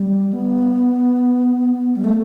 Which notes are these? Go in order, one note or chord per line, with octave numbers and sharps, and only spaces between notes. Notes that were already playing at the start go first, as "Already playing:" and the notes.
Already playing: G3
B3
G3
A3